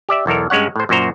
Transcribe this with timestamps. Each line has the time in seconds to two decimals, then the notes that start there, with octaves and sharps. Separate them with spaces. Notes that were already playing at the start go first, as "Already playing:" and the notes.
0.09 G4 D5 E5
0.26 B1 E2 A4 A#4
0.50 G2 G#3 C#4 C#5 F#5
0.76 A2 C5
0.89 F#2 A#2 F#4 C5 A#5